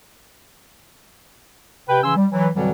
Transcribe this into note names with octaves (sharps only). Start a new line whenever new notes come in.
C3 B4 G5
C#3 E3 C#4 G#5 C6 E6
G3
E3 F#3
F2 B2 D3 E3 F#3 G3